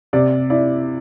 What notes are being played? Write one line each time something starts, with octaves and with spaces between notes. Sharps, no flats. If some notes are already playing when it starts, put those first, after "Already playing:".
C3 D5
E4 D5